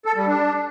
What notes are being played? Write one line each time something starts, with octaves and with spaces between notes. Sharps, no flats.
A4
G3
D4